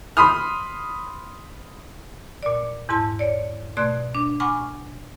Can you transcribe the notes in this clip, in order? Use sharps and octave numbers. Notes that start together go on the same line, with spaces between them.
B5 C6 D#6 F6
A#2 D5
E2 G#2 E4 A5 C6
C#5 D5
B2 A3 D5 C6 F#6 G#6
D4 D6
F#5 G#5 B5 C#6 D6 F6